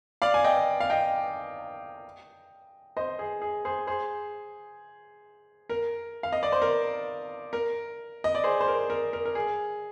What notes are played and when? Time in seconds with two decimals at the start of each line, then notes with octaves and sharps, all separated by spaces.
0.22 D5 F5
0.34 G#5
0.44 D#5 G5
0.80 F5
0.90 D#5 G5
2.97 C5 D#5
3.19 G#4
3.42 G#4
3.65 G#4 C5
3.87 G#4 C5
5.70 A#4
6.23 F5
6.33 D#5
6.43 D5
6.52 C5
6.62 A#4
7.53 A#4
8.24 D#5
8.35 D5
8.44 G#4 C5
8.61 C5
8.68 A#4
8.90 A#4
9.13 A#4
9.25 A#4
9.35 G#4